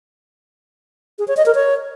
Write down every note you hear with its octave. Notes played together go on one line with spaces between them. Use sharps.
G#4
C#5
D#5
A#4
C#5